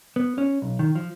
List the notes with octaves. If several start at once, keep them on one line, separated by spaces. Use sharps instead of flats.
B3
C#4
B1
D#3
F3